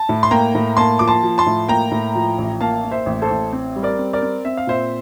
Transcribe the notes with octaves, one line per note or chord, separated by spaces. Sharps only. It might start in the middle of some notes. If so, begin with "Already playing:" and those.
Already playing: A5
A2
C6
A#3 G5 A#5
A2
A#3 A5 C6
F3 D6
A5 C6
F3
A5 C6
A2
A#3 G5 A#5
A2
F3
A1
A#3 F5 A5
A#3
C5 E5
A1
A4 C5
A1
C4
G3
A#4 D5
C4
A#4 D5
C4
C4 E5
F5
A#2 C5 E5